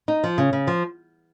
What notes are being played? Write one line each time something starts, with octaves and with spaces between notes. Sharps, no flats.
D#4
F3
C#3
C#3
F3